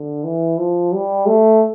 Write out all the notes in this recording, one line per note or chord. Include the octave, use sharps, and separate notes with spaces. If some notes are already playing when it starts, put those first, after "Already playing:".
Already playing: D3
E3
F3
G3
A3